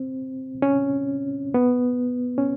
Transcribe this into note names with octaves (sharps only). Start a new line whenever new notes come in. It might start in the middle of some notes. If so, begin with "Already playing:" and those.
Already playing: C4
C#4
B3
C#4